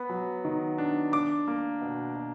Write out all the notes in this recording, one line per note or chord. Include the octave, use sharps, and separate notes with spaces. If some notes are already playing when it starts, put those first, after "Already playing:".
Already playing: B3 B5
F#3
D#3
D4
D4 D6
A#3
B2
B2